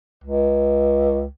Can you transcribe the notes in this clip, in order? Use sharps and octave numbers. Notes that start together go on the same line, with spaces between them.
C#2